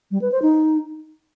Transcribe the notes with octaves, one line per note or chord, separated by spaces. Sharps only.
G3
B4
C5
D#4